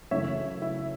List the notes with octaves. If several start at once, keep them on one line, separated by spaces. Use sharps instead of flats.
F#2 C#3 E3 A3 C#5 E5
E4